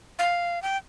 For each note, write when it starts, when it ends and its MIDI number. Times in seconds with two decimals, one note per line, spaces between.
0.19 0.61 77
0.62 0.77 79